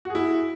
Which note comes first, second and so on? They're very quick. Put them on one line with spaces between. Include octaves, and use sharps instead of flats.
F#4 G#4 E4